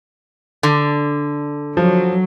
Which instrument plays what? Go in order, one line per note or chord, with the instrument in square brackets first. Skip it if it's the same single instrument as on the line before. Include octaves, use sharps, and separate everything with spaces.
[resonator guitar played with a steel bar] D3
[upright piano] F3 [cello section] F#3